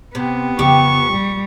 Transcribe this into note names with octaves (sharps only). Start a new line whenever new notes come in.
C3 B3
F2 C#3 E3 G4 C#6
A#1 G3